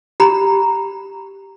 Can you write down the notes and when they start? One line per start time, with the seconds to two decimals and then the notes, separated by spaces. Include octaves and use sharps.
0.20 G4 A#5 B5